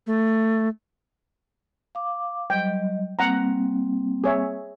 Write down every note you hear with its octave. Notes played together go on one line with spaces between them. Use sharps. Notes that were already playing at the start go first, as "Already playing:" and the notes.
A3
F5 D6
F#3 G3 D#5 G5
G3 A#3 C4 F#5 A#5
G#4 C#5 E5